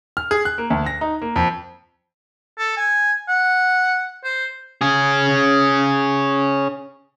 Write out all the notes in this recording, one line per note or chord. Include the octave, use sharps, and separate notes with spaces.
F6
G#4
F#6
A#3
D2
A#6
D#4
A#3
F2
A4
G#5
F#5
C5
C#4 G#4